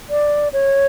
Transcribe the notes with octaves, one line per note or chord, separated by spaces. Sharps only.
D5
C#5